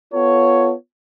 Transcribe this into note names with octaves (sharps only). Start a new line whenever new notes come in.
B3 F4 A4 C#5